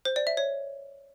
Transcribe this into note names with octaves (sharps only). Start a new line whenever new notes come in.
C5
D5
E5
C#5